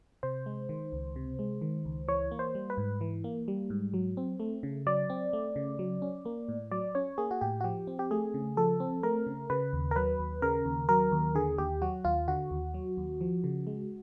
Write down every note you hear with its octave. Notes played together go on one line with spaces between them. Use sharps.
C3 C5
G#3
D#3
C#2
C3
G#3
D#3
C#2
E3 C#5
A#3
C5
G3
B4
G#2
E3
A#3
G3
G#2
F#3
C4
A3
C#3
F#3 D5
C4
A3
C#3
F#3
C#4
A#3
A2
F#3 D5
C#4 C#5
A#3 G#4
F#4
A2 G4
F#4
F3 G4
C4
G4
A3 G#4
C#3
F3 A4
C4
A3 A#4
C#3
C#3 B4
D#2
A#4
F#3 B4
D#2
C#3 A#4
D#2
F#3 A#4
D#2
D3 G#4
D#2 G4
F#3 F#4
D#2 F4
D3 F#4
D#2
F#3
D#2
F3
C#3
G#3